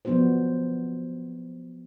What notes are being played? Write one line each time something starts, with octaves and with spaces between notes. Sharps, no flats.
F3 F#3 B3 D4 F#4 C5